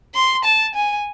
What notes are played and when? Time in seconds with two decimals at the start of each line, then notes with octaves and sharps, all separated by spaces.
0.15 C6
0.45 A5
0.75 G#5